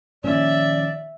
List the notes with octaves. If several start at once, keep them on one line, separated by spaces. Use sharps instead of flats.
A#2 D#3 F3 C#4 D5 E5